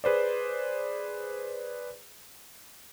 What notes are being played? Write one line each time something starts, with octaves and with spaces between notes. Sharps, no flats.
G#4 B4 C5 D5